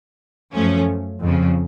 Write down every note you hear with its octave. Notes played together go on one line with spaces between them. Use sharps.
F#2 F3 A3 C#4
F2 C#3 F3